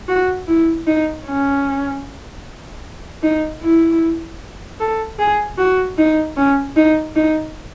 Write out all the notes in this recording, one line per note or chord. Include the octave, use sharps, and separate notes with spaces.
F#4
E4
D#4
C#4
D#4
E4
A4
G#4
F#4
D#4
C#4
D#4
D#4